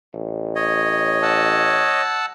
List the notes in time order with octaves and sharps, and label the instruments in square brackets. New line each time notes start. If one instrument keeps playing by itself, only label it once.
[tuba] A1
[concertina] C#5 D#5
[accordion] F#5 A5 E6